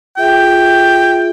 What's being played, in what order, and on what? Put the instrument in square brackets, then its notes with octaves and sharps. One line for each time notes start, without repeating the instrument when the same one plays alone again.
[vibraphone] F4 G#4 E5 [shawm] G5